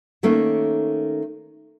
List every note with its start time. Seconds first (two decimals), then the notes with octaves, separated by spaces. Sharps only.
0.23 D#3 A3 A#3 C#4